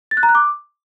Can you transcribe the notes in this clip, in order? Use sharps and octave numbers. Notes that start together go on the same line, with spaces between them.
A6
F#6
A#5
F#6
D6